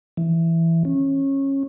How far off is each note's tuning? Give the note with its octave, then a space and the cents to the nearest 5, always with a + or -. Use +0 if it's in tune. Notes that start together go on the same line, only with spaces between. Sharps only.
E3 +5
C#4 -20